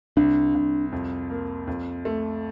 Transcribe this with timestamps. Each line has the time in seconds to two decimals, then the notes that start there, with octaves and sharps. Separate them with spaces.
0.17 C2 D4
0.54 C2
0.92 F2
1.30 A#3
1.67 F2
2.05 A3